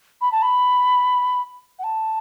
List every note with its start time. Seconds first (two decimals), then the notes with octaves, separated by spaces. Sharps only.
0.21 B5
0.32 A5
0.42 B5
1.79 F#5
1.84 A5